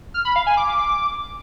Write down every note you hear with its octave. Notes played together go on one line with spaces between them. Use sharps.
F6
B5
F5
G#5
D6